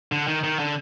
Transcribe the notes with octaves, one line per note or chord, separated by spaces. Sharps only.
D3
D#3
D#3
D3